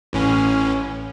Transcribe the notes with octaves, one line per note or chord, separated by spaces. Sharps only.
A1 A2 C#4